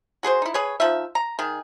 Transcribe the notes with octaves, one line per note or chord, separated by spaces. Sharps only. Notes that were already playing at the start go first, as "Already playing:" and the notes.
F#4 G#4 B4 C5
D#4 E4
G#4 B4 C#5
F3 D#4 E5
A#5
D#3 G#4